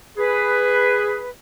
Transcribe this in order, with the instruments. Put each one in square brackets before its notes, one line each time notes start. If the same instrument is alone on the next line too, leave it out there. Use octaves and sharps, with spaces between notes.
[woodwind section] G#4 B4